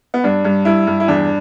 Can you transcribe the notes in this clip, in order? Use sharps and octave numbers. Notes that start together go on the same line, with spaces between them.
B3
G2 D4
G2
G2 E4
G2
E4
E2 D4